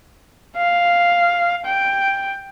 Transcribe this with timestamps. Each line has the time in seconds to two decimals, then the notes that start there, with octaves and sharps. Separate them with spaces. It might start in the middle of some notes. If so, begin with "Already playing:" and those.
0.57 F5
1.66 G5